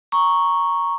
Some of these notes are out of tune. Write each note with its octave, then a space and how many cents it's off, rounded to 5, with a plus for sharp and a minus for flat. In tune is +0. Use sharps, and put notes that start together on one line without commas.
A#5 +0 C#6 +0